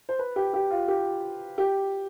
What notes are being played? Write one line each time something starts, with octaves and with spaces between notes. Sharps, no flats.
C5
B4
G4
G4
F4
G4
G4